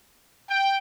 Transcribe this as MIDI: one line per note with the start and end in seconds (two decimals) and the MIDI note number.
0.48 0.77 79